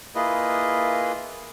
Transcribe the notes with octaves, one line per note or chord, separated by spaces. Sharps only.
A#3 E4 F4 G#4 B4 D#5